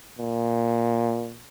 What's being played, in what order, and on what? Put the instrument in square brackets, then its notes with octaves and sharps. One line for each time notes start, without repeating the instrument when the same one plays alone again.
[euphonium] A#2